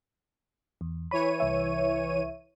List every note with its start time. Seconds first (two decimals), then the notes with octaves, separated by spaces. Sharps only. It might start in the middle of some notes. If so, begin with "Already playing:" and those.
0.81 E2
1.11 E3 C#5 B5 D#7
1.40 C2 E5